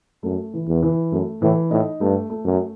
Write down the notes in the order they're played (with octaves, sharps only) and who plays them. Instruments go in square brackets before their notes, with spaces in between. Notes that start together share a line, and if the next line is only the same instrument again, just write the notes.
[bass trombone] F#2 [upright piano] A3
[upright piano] E3
[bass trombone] E2
[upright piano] E3
[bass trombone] F#2 [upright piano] A3
[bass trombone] A2 [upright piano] E3
[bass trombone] A2 [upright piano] D#4
[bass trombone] G2 [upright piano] A3
[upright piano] A3
[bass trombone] F#2